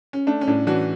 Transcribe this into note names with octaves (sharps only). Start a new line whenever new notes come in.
C#4
A3 D4
C#4
A2 D4
E3 D4 F#4